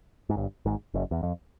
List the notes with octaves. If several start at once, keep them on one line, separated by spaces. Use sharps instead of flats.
G#2
G1 G2
G#1 G#2
F#1 F#2
E2
F2